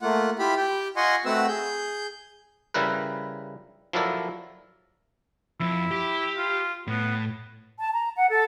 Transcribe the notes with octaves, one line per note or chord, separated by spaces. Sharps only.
A3 A#3 F4 F#5
E4 F4 G4 B5
G4 G5
F4 D#5 F#5 G#5 C6 C#6
A3 C4 F#4 B4 F#5 E6
G#4 G6
C#3 G3 E4 A#4 B4
F3 F#3 E4 A4 A#4 D5
F2 F3 E4
G4
F4
A2 B3
A5
A#5
F#5
A4